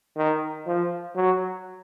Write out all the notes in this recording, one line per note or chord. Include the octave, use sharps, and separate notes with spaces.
D#3
F3
F#3